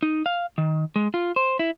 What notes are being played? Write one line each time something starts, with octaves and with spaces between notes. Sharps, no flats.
D#4
F5
D#3
G#3
F4
C5
E4